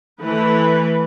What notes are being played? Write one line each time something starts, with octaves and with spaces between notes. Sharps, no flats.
E3 A3 B4